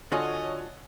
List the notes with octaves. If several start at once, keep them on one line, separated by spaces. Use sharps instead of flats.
D3 F4 F#4 A4 C#5 D#5 G#5